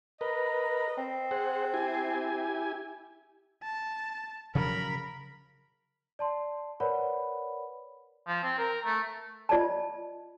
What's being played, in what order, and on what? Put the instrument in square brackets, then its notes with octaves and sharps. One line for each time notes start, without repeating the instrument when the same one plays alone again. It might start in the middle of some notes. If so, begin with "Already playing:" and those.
[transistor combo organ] A#4 B4 [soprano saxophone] D#5
[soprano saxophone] C4
[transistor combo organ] G#4 C5 F#5
E4 G4 G#5
[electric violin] A5
[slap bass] C#3 F3 F#3 [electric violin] A#4 B5
[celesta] D5 A5 C6
A#4 B4 C#5 D5 F#5 B5
[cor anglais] F3
C4
A#4
A3
[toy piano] F4 D5 D#5 A5